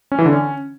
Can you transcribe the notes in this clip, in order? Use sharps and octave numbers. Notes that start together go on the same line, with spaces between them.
C#4
E3
D3
C#4